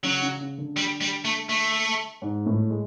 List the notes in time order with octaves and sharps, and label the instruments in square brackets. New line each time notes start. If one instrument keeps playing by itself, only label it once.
[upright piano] C#3 [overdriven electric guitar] F#3
[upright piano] C#3
C#3
D3
[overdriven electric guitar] G3
G3
A3
A3
[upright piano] G#2 G#3
A2 A3
G#3